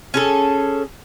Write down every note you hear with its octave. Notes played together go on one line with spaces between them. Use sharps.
C#4 G#4 A4